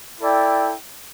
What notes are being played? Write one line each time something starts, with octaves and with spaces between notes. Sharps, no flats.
E4 A4 D5 G5